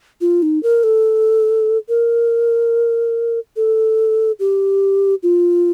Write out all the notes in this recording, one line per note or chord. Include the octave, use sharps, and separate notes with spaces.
F4
D#4
A#4
A4
A#4
A4
G4
F4